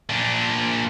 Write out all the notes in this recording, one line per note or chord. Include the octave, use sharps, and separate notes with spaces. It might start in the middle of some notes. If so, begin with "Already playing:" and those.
A#2 D4